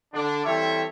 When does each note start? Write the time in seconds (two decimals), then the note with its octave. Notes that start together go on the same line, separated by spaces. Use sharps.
0.13 D3 D4
0.45 E3 G3 C4 A4 C#5 E5